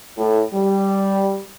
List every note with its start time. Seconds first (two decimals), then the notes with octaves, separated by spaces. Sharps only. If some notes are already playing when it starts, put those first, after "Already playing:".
0.17 A2
0.53 G3